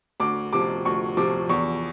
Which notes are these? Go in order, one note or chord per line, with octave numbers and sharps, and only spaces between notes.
D2 D6
C3 F3 D6
D2 C#6
C3 F3 D6
E2 C#6